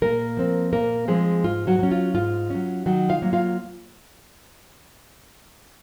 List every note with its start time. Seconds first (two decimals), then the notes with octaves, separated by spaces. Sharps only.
0.02 A#2 A#3 A#4
0.37 F3 C4
0.73 A#2 A#3 A#4
1.08 F3 G#3 C4 G#4
1.44 G#2 F4
1.67 F#3 F#4
1.79 F#3 C#4
1.91 F4
2.15 G#2 F4
2.50 F#3 C#4
2.86 D#3 F#3 F#4
3.09 F4 F5
3.22 F#3 A#3
3.33 F4 F5